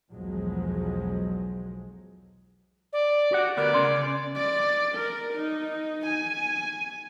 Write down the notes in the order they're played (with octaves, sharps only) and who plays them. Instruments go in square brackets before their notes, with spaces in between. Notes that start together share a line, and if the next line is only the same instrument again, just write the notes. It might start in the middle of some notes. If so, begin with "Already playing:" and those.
[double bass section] B1 E2 F3 F#3 G#3
[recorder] D5
[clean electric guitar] F#4 G4 F#5
[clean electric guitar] D2 B3 A#4 [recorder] D5
[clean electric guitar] C#3 C#4 C6
[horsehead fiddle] D5
A#4
D#4
G#5